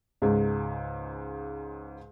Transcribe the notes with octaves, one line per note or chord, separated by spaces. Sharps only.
C#2 G#2